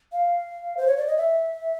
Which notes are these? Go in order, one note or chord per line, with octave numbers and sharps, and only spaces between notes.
F5
C5
C#5
D5
D#5
E5